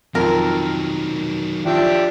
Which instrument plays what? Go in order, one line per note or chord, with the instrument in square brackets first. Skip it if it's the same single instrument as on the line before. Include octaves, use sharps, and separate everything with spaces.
[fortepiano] F2 [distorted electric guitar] D#3 F#3 [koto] A#4
[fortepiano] F3 [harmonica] D4 G4 E5